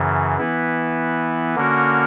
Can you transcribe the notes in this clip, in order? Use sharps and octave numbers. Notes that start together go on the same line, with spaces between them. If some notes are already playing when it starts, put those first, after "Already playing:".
Already playing: F#2 C#3 E3
E3 B3 E4
D3 A#3 C#4 F#4 A#4